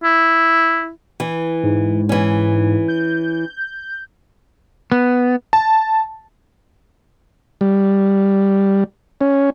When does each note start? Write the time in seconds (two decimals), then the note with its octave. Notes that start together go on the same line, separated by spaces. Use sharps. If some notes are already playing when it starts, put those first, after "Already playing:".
0.04 E4
1.20 E3
1.63 G#2
2.09 E3 C#4
2.88 G6
4.92 B3
5.53 A5
7.61 G3
9.21 C#4